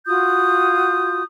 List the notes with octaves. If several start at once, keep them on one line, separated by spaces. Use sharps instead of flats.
F4 F#4 D#6 G6